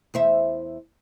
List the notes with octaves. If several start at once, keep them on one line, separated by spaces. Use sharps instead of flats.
E2 C5 E5